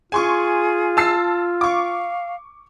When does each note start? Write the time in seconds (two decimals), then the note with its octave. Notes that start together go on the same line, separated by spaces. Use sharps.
0.12 F4 G#4 G#5 C6 C#6
0.97 A5 E6 C7
1.61 F5 C#6 D6